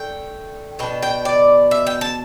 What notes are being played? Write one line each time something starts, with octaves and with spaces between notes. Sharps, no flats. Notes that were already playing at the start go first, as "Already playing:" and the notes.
Already playing: A3 D4 G5
B2 B3 D4 G5
G5
D5
E5
G5
A5